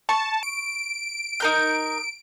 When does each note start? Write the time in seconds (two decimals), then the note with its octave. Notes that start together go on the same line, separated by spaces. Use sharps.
0.09 A5 C#6
0.43 D7
1.40 D#4 A#4 G6